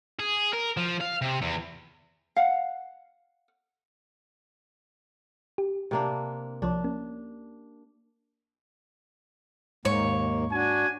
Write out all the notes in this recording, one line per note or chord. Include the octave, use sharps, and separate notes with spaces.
G#4
A#4
F3
F5
C3
E2
F5 F#5
G4
C3 A#3 D4
C2 F3 D4 C#5
A#3 C#4
D#2 G#2 A#3 C#5
D4 F#4 G#5